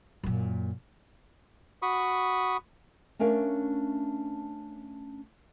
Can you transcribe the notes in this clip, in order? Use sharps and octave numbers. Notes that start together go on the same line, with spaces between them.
F#2 A#2
F#4 B5 C#6 D#6
A3 C#4 D4 A#4 F5